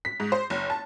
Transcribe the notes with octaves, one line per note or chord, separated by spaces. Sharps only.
B6
G#2
C5
F#1
A5